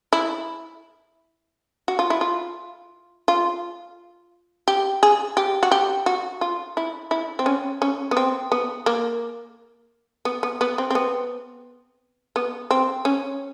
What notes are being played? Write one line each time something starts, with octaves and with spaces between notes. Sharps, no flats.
E4
F#4
F4
E4
F4
F4
G4
G#4
G4
F#4
G4
F#4
F4
E4
E4
C4
C#4
C#4
B3
C4
B3
A#3
B3
B3
B3
C4
C4
B3
B3
C4
C#4